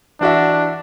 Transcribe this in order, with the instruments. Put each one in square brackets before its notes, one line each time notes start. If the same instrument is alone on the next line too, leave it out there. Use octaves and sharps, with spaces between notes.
[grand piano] E3 F#4 E5 [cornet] D4